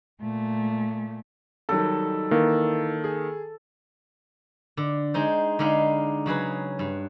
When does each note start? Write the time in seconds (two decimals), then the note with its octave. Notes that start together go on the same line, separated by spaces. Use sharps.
0.21 A#2 A3
1.69 D#3 F#3 G3 A4
2.31 D#3 E3 A#3
3.04 G#4
4.77 D3
5.14 G#3 D#4 C5
5.59 D3 G#3 D#4 F5 B5
6.26 C#3 F#3 G#4 B4
6.79 G2